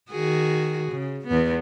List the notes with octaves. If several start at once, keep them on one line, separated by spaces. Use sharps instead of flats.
D#3 F#4 G#4
C#3
E2 B3